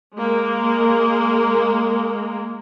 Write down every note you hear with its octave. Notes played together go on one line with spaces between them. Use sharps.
G#3 A#3